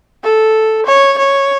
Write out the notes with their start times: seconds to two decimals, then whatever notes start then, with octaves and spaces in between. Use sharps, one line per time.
0.24 A4
0.86 C#5
1.18 C#5